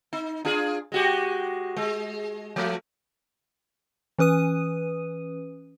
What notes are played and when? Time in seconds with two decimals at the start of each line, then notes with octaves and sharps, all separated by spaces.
0.13 D#4
0.45 D4 F4 G#4
0.92 G#3 F#4 G4
1.76 G#3
2.56 F3 A3
4.19 E3 C#4 B4 D#6 D#7